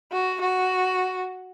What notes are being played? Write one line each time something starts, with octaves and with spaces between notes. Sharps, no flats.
F#4
F#4